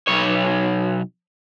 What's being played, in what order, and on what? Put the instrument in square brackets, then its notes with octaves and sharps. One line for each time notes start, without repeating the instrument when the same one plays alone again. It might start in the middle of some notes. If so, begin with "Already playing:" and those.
[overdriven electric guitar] B1 C#5